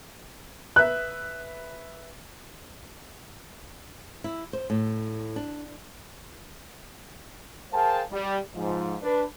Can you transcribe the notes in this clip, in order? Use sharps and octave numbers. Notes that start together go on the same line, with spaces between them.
B4 E5 F#6
E4
C5
A2
D4
G#4 A#4 C5 F5 G5 A5
G3
G#2 F3
D4 B4